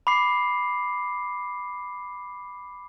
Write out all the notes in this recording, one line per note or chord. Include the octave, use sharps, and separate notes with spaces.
B5 D6 C7